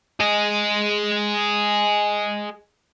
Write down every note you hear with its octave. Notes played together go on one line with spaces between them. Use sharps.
G#4 D#5